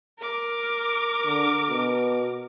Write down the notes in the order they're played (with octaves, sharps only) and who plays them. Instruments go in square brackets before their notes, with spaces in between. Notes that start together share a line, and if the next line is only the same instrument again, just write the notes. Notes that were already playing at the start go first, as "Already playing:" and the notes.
[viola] A#4 D6
[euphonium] D3
B2